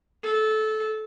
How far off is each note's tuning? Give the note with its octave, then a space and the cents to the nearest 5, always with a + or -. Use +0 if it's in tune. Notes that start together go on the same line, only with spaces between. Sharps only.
A4 -20